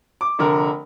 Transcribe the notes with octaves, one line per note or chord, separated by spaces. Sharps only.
D6
F1 D3 D4 A#4